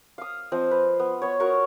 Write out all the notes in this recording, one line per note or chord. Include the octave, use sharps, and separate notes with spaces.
F5 D#6
F3 C4 D#5
B4
B3
B3 C#5
F#4 A#4 A#5 C#6